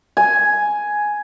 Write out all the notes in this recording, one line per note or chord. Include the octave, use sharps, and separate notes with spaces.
G#5